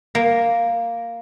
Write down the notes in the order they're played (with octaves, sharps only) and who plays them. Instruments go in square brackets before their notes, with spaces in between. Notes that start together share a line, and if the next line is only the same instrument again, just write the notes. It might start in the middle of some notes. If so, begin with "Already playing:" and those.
[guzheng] A#3